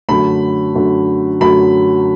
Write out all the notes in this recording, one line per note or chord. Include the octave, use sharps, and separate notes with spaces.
F#2 D3 A3 B5
F#2 D3 A3
F#2 D3 A3 B5